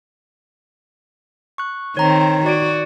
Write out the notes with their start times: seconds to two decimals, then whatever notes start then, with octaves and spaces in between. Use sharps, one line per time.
1.58 C#6 F#6
1.97 D#3 C4 C#5 A#5
2.46 F#4 D5 G#6 D7